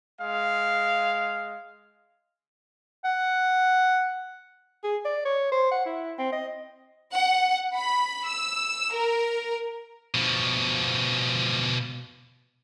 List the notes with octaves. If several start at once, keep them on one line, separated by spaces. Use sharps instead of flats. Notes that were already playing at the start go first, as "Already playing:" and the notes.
G#3 F5
F#5
G#4
D5
C#5
C5
F#5
E4
C4
D#5
F#5
B5
E6
A#4
B2 F3